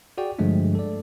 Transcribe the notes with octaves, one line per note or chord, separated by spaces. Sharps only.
F#4 G#4 D5 G5
G2 D3 F3 G#3 A3 D4
A4 D5